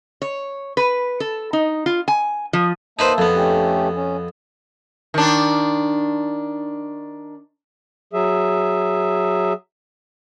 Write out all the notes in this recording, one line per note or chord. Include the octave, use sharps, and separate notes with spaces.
C#5
B4
A4
D#4
F4
G#5
F3
A#3 D#4 B4 C5 E5 A5
F2 B3
A3 C#4 G4
C#4
D#3 D4
F#3 G#4 E5